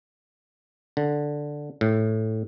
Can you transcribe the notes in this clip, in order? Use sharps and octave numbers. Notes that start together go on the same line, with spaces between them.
D3
A2